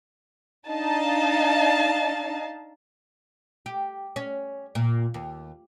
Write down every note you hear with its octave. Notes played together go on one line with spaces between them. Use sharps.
D4 D#4 D#5 F5 A5
G4
C#4
A#2
D#2